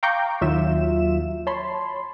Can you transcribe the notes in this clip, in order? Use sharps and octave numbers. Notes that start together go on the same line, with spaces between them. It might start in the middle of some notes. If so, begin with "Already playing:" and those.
F5 G5 A#5 C#6 D6 G6
D#2 F#3 F4 E5 E7
C#5 A5 B5 C6